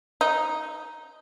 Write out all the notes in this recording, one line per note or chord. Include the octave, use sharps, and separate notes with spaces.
D#4